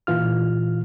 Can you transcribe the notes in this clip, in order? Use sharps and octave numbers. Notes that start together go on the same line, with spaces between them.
A#2 E3 F4 F6